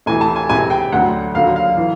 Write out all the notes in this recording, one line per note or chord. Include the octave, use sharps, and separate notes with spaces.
D2 C3 E3 G#5
A5
G#5
C#2 C3 E3 G#5
G5
D2 D3 F#3 F#5
D#2 D3 F#3 F5
F5
E3